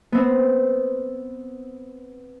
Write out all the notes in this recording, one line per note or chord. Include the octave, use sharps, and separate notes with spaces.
B3 C4